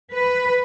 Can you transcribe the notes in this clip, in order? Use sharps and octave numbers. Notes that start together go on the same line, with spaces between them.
B4